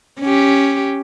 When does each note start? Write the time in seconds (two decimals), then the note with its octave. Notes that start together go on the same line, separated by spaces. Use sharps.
0.21 C#4 G4